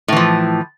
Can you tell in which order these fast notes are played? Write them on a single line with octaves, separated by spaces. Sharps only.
A2 E3 F3